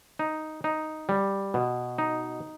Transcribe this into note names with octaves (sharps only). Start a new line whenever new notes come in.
D#4
D#4
G3
B2
D#4